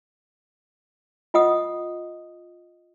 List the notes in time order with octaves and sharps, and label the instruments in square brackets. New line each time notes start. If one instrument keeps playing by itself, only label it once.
[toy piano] F4 D#5 F#5 D#6